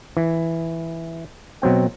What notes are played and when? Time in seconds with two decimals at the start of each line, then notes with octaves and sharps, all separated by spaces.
0.17 E3
1.62 B2 F#3 C4 G5